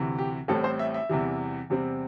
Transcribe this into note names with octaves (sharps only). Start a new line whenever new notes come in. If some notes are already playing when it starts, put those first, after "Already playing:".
Already playing: D2 C3 E3
G4
A1 A2 G3 C4 A4
C5
E5
E5
E2 C3 E3 G3
E2 C3 G3 C4